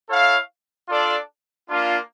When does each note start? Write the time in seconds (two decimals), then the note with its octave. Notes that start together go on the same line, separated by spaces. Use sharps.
0.09 E4 A4 C#5 F5
0.89 D4 F4 A4 D5
1.68 A#3 D4 F4